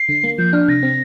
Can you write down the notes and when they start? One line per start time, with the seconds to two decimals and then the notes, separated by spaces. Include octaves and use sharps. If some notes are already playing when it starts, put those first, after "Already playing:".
Already playing: C7
0.09 D3
0.24 A#3
0.38 F3 G6
0.53 D4 F6
0.68 C3 A#6
0.83 C4